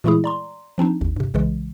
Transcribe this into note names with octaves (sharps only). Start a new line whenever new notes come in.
A#2 E3 G#3 A3 E4 G#4
D5 A#5 C6
F3 C4 D4 D#4
G#1 D#2
G2 C3
B1 C#3 E3 G#3